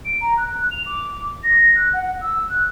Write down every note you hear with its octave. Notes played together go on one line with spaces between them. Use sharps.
D7
A#5
F#6
F7
D6
A#6
F#6
F#5
E6
F#6